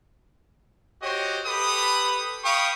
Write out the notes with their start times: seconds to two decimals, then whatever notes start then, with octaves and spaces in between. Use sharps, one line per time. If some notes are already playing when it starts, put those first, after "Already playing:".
1.02 F#4 G4 C5 C#5 D#5
1.45 G4 A4 B4 B5 D#6
2.44 F5 G5 B5 C#6 D#6